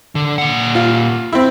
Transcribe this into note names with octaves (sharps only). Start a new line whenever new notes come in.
D3
A#2 F#5
F4
C4 E4